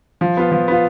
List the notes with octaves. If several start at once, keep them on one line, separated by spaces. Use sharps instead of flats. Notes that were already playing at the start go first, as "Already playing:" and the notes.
F3
B3 F4
F3
B3 F4